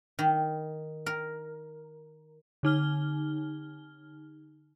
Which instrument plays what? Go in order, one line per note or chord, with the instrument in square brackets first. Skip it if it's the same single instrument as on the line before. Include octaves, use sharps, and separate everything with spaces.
[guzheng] D#3
A#4
[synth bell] D3 D#4 F6 G7